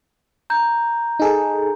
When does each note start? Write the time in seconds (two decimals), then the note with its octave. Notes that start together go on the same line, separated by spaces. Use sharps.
0.50 A#5 G6
1.19 D#4 G#4 A4